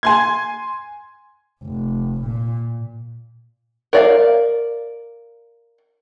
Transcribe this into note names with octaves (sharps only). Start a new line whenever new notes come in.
G#5 C6 G#6
F1
A#2
A#4 D5 F5